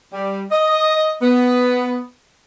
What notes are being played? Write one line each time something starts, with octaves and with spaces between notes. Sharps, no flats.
G3
D#5
B3